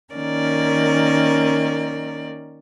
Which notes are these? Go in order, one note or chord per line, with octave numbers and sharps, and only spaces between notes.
D#3 A#3 C#4 A#4 D5